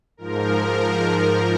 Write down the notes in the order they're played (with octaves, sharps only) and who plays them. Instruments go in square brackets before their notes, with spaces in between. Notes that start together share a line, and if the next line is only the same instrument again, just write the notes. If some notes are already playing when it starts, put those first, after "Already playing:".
[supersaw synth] G#2 F3 A#4